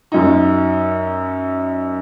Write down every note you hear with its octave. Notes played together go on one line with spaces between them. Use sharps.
F#2 D#4